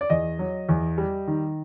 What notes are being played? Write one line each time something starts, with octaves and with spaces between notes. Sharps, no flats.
D5
E2 D#5
F#3
E2
G3
D#3